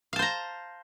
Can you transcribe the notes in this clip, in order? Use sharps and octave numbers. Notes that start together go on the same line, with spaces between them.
C5 F5 A5 A#5